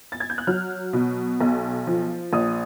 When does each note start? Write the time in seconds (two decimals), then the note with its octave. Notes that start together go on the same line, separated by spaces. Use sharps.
0.12 A6
0.20 G#6
0.30 G6
0.38 F#6
0.47 F#3 F6
0.93 B2
1.41 B1
1.87 F3
2.33 A#1 D#6